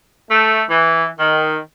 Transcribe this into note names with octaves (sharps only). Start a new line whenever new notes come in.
A3
E3
D#3